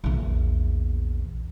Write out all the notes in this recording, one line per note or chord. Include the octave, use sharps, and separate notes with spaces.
A#1 E2